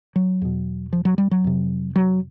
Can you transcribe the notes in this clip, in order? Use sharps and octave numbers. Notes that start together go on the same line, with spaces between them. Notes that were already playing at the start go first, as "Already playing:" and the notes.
F#3
E2 B2
F3
F#3
G3
F#3
F2 C3
F#3